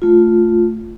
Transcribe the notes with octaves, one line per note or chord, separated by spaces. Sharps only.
A3 F4